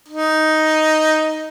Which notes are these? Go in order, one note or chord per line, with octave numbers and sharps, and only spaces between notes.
D#4